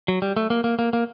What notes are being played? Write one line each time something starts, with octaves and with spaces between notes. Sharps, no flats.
F#3
G3
A3
A#3
A#3
A#3
A#3